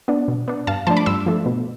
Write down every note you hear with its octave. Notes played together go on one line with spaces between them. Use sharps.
B3 D4
B2
B3 D4
G2 F5 A5
F3 A3 D4 A5 C6
B5 D6
G2 C6 E6
F3 A3 D4
B2